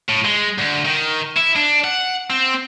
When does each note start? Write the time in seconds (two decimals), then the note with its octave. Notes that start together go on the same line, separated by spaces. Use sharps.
0.09 A2
0.24 G#3
0.58 D2
0.85 D#3
1.36 E4
1.56 D4
1.84 F#5
2.30 C4